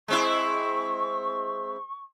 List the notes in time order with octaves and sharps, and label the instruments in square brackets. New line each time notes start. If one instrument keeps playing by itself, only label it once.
[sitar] G#3 C4 E4 [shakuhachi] C#6